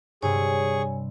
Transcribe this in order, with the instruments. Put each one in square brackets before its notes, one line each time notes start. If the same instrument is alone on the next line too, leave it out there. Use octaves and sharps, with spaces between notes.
[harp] G2 C3 [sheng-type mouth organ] G#4 C#6 [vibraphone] C#5 G#5